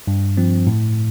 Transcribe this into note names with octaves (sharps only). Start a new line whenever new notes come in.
G2
F3 C4
A2